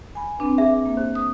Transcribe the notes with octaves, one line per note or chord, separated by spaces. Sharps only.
G#5 B5
C4 D4 B4
G#4 E5 D6
A#3
C5
D#6